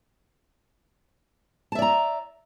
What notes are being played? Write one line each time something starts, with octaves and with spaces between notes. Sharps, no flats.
D5 E5 A5 A#5